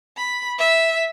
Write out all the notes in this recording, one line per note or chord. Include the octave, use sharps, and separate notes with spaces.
B5
E5